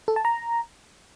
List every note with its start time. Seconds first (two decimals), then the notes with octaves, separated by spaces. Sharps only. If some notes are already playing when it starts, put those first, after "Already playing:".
0.08 A4
0.16 A5
0.25 A#5